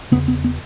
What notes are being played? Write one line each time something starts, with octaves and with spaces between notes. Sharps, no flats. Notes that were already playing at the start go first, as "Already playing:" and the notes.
E2 C#3 B3
B3
B3